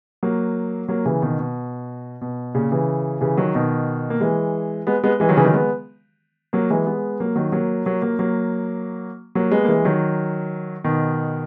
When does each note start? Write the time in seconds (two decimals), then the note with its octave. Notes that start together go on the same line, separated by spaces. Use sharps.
0.23 F#3 A#3
0.88 F#3 A#3
1.05 C#3 E3
1.22 B2 D#3
1.39 B2
2.21 B2
2.54 A#2 C#3
2.71 C#3 E3
3.21 C#3 E3
3.37 D#3 F#3
3.55 B2 D#3
4.10 A#3
4.21 E3 G#3
4.87 G#3 B3
5.04 G#3 B3
5.20 E3 G#3
5.29 D#3 F#3
5.37 C#3 E3
5.45 D#3 F#3
5.53 G#3 B3
6.53 F#3 A#3
6.70 E3 G#3
6.86 G#3 B3
7.20 F#3 A#3
7.36 D#3 F#3
7.52 F#3 A#3
7.86 F#3 A#3
8.02 F#3 A#3
8.19 F#3 A#3
9.35 F#3 A#3
9.51 G#3 B3
9.64 A#3
9.68 E3 G#3
9.85 D#3 F#3
10.84 B2 D#3